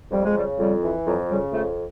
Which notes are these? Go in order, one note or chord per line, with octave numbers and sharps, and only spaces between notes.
F2 G3
G#3
C#3 G3
F2 G3
E3
F2 F#3
C#3 G3
F2 A3